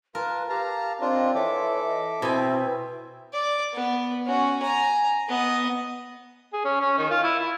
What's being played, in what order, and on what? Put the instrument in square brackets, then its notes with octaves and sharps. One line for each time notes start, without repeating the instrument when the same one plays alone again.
[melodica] F4 A5 [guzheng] A#4 [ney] B4
[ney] G4 [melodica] F5 A5 A#5
[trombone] C4 [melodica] D4 F4 [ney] D#5
[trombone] E3 [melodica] A4 E5 D6 [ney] C#5
[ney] D#5
[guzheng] B2 G#5 [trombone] C4 [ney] E4
[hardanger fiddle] D5
B3
C#4 F#4
G#5 A#5
B3 D#5
[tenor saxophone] G#4
C#4
C#4
D#3
F4
E4
E4